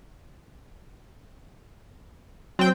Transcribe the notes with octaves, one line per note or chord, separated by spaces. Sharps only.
F#3 C4 G5